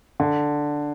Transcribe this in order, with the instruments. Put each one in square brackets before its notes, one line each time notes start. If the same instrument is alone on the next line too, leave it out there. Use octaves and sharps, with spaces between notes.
[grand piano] D3